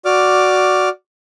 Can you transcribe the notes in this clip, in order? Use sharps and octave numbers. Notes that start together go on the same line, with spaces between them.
F#4 D5 D6 F6